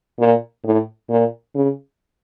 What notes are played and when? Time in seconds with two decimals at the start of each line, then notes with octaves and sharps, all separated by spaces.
0.19 A#2
0.64 A2
1.10 A#2
1.55 C#3